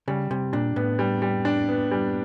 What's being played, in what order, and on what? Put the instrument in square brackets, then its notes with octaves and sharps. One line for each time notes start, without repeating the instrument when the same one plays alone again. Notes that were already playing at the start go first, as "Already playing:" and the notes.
[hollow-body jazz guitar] C#3 [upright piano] G3
[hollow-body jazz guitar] C3 [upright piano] G3
[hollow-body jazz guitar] A#2 [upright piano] D4
[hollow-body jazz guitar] A2 [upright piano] B3
[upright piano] G3
G3
D4
B3
G3